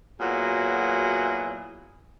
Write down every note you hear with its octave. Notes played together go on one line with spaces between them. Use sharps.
A#2 F#3 B3 E4 F#4 G#4